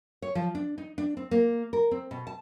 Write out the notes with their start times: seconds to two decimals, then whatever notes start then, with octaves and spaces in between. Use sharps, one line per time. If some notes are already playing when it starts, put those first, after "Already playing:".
0.22 C#5
0.35 F3
0.55 D4
0.78 D#4
0.98 D4
1.17 C4
1.31 A#3
1.73 A#4
1.91 C4
2.11 B2
2.27 A5